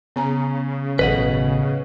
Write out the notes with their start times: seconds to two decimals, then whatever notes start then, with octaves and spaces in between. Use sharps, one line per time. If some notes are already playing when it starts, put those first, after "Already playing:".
0.16 C#3 B3 G#5 A#5
0.99 A1 B2 D#3 F#3 A4 B4 D#5 F#5